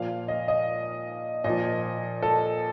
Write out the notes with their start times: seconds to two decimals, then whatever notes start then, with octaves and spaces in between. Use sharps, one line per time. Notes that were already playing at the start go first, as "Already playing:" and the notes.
Already playing: A#2 F3 F5
0.28 D#5
0.48 D#5
1.44 A#2 D#5
1.50 F3
2.23 A4